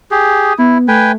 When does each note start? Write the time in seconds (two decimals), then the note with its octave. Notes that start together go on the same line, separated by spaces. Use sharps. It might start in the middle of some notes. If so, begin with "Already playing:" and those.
0.11 G4 G#4
0.39 D#6
0.59 B3 E4
0.88 A3 B4 G5 G#5